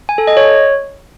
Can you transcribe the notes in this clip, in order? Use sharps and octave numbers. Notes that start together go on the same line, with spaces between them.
G#5
A4
D#5
C#5